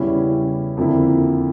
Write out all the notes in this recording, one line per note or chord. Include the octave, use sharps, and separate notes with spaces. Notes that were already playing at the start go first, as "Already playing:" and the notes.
Already playing: E2 C#3 G3 C#4 E4
F2 D3 F3 A#3 E4